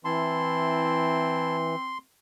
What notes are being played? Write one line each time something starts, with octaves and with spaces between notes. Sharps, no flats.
E3 C4 E4 A5 C6